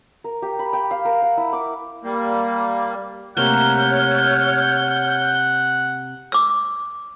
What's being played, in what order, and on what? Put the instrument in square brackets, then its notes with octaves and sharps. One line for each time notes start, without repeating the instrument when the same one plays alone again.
[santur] A#4
G4
B5
G5
F5
A#4
F#5
E4
D6
[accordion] G3 A#3
[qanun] C3 A3 A#3 [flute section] C#5 F6 [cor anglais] F#5 [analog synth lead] G6
[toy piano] D6 E6